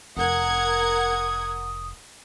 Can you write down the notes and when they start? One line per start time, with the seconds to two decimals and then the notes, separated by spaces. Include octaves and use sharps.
0.17 F1 A#4 F#5 D#6 G#6